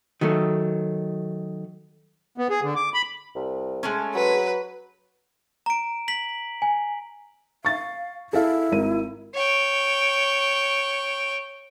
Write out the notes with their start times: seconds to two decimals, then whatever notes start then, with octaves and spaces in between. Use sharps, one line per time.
0.21 D#3 F#3 A3
2.38 B3
2.50 G#4
2.62 D3
2.76 D6
2.94 B5
3.35 C2
3.83 G#3 A3 C#4
4.15 F#3 B4
5.66 A#5 D7
6.08 B6 F#7
6.62 G#5
7.65 F5 C#6 A6
8.33 E4 G#4 A4 F5
8.72 G#1 A#4 D#7
9.35 C#5 G5